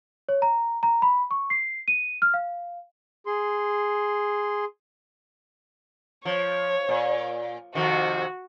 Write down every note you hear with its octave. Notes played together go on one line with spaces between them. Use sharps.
C#5
A#5
A#5
B5
C#6
C7
D#7
F6
F5
G#4 C6
F3 C#5
A#2
F2 C3 D#3 F#4